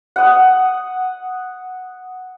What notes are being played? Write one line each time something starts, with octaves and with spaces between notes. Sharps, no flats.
F#5 D#6